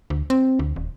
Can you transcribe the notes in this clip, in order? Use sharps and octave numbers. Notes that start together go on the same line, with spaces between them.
D2
C4
D2
D#1